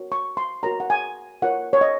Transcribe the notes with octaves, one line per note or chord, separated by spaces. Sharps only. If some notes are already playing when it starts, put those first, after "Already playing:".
Already playing: F#4 A#4 C#5
C#6
C6
F#4 A#4 C#5 A#5
F#5
G#5
F4 A#4 C#5 F#5
C#5
D#5